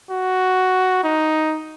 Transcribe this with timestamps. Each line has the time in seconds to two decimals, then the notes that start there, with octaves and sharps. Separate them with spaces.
0.11 F#4
1.04 D#4